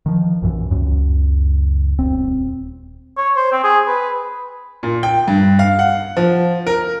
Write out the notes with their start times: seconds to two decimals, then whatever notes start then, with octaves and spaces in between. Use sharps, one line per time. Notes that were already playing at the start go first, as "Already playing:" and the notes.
0.06 D#3 F3
0.42 A#1 F#2 E3
0.71 C#2 F#2
1.99 D#1 C4
3.17 C#5
3.36 C5
3.52 C4
3.63 G#4
3.87 B4
4.83 A#2
5.03 G5
5.28 G2
5.59 F5
5.79 F#5
6.17 F3
6.67 A#4